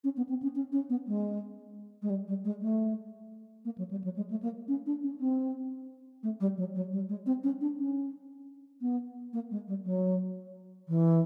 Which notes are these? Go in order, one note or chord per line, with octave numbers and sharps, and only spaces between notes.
C#4
B3
C4
C#4
C#4
C#4
B3
G#3
G#3
G3
G3
G#3
A3
A#3
F#3
G3
F#3
G#3
A3
A#3
C#4
D4
C#4
C4
A3
G3
F#3
F#3
G3
G#3
C4
C#4
D4
C#4
B3
A#3
G#3
G3
F#3
E3